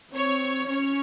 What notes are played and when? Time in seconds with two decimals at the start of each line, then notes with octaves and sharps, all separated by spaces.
0.13 C4 C#5
0.68 C#4 C#5